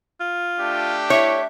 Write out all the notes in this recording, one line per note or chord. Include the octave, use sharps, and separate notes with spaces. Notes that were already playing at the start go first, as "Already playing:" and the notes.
F4
A3 D4 G4
E4 C#5 E5